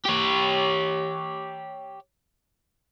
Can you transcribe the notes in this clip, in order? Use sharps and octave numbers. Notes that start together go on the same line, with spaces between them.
G4 C#5